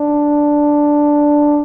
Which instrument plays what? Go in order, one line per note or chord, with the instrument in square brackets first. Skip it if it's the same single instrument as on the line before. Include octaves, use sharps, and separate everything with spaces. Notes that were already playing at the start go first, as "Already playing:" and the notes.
Already playing: [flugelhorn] D4